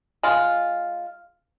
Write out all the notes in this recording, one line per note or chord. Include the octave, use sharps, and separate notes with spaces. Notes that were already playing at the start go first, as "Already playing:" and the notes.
G#3 F4